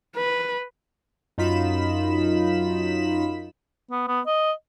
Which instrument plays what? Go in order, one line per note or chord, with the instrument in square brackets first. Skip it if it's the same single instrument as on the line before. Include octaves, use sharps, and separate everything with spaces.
[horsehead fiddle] B4
[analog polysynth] F#2 D#4 F4 B5 B6 E7
[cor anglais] B3
B3
D#5